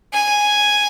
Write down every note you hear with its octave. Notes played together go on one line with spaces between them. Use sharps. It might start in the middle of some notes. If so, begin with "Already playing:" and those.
G#5